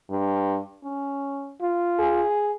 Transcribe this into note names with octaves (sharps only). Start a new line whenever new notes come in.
G2
C#4
F4
G#4